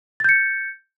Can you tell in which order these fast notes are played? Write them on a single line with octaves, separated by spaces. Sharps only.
A6 G6 C#7